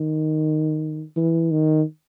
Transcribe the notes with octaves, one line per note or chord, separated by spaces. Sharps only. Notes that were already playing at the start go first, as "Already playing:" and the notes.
Already playing: D#3
E3
D#3